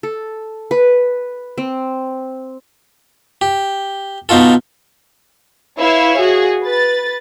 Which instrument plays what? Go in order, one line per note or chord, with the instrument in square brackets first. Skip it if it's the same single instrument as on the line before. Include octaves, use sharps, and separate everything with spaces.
[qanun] A4
B4
C4
[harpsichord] G4
B2 D#4 F4 A4
[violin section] E4 B4 C#5 E5 F5
F#4 G#4
B4 A6